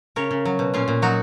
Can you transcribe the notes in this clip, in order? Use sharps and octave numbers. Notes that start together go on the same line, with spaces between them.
C#3 A#4 C#5
C#3
F#3
B2
A#2 C#4 F4
A#2
F#3 D#4 F#4